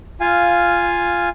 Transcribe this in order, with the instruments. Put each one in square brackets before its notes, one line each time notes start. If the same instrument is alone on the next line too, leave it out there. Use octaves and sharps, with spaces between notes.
[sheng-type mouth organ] F4 F5 G#5